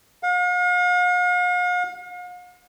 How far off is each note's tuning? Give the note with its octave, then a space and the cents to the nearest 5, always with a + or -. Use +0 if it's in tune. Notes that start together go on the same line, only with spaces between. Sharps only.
F5 +45